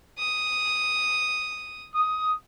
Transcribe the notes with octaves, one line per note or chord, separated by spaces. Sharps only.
D#6
D#6